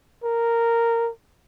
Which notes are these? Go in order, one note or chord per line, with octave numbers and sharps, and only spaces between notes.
A#4